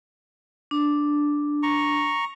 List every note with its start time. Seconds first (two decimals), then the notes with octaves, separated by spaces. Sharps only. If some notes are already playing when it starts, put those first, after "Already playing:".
0.71 D4
1.63 A#5 C#6